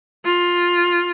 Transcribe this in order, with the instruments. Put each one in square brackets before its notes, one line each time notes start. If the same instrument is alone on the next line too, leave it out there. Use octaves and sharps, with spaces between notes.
[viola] F4